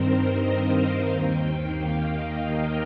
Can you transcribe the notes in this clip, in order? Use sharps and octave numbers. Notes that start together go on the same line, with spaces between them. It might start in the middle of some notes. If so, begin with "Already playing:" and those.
Already playing: G2 D#3 C4 A#4 C5
D#5
F5
D#2 D#3 A#3 G5
F5
D#5
A#4